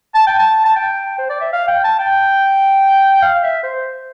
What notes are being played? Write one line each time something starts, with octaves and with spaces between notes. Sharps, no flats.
A5
G5
A5
A5
G5
C5
D5
E5
F5
G5
A5
G5
F5
E5
C5